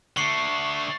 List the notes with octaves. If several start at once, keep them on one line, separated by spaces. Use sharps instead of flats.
D3 A3 C#6 C7 C#7